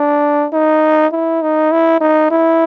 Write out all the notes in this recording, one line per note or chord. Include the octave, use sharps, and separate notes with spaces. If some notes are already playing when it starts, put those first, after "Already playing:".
Already playing: D4
D#4
E4
D#4
E4
D#4
E4